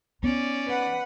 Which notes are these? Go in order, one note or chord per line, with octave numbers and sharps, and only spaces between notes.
B3 C#4 D#4 D5
B4 F#5